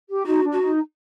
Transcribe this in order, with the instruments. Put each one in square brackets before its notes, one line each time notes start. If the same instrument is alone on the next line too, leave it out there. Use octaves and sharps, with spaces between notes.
[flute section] G4
[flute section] D#4 [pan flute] F#4
[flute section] D4
[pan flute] F#4
[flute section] D#4